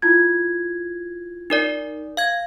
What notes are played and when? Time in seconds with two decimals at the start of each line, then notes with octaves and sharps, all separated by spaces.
0.02 E4 F4 G#6
1.50 D#4 A#4 D5
2.17 F5 G#6